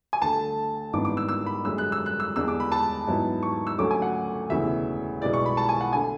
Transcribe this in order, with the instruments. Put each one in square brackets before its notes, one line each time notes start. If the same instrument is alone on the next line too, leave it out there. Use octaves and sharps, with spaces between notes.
[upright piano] G#5
D2 D3 A3 A5
G#1 G#2 E3 B3 D4 D6
D6
E6
E6
B5
F#2 D3 G#3 E6
F#6
E6
F#6
E6
E2 D3 G#3 D4 E6
D6
B5
A5
G#2 F#3 B3 E4
C#6
E6
D2 D3 F#3 A3 C#4 D6
G#5
F#5
E1 D2 C#3 E3 B3 E5
B1 B2 G#3 B3 E4 D5
C#6
B5
A5
G#5
F#5
D3 A3 G#5